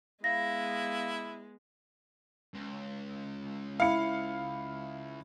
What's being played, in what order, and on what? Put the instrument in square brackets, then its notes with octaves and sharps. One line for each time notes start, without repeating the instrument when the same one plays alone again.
[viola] G#3 B3 [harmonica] E4 [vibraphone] F5 [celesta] A#6
[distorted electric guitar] C#2
[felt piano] E4 C#7 [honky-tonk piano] F5